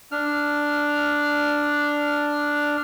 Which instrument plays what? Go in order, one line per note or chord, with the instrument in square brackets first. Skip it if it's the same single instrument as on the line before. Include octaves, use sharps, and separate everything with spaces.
[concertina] D4 F6